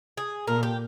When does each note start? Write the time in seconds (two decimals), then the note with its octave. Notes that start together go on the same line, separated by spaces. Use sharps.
0.17 G#4
0.47 A#2 A#4
0.63 G4